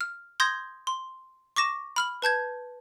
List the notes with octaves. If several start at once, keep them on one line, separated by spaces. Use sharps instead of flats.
F6
C6 D#6 G6 G#6 A#6
C6
C#6 D6 A#6 E7
B5 F6 F#7
B4 A5 G6 G#6